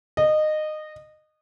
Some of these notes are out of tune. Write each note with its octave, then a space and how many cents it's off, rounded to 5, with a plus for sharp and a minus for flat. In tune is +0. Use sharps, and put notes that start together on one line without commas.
D#5 -20